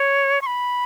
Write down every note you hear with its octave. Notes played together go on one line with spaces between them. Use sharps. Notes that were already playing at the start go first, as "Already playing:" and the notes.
Already playing: C#5
C#6
B5